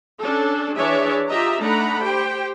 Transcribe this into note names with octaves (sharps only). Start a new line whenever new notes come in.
C#4 D4 A4
E3 D4 G#4 C#5 D5 E5
F4 G4 D#5 E5 A#5
A3 D4 D#4 F#5 A#5 B5
G4 C5 G5